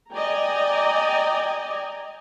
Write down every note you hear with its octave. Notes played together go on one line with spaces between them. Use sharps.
D5 D#5 G5 G#5 A#5